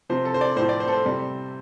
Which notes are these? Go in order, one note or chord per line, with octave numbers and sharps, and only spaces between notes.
C3 F3 C5
A4
C5
D5
A2 F3 C5
D5
C5
A4
C5
C3 G3